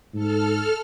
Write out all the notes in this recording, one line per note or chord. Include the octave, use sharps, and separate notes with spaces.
G#2 A4 F6